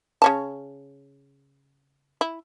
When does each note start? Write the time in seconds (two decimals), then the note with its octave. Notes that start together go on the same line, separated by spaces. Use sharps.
0.22 C#3 C#4 A5
2.21 E4